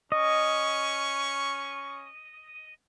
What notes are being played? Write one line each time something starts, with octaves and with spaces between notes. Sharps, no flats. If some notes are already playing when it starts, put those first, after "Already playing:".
C#4 D#5 C#6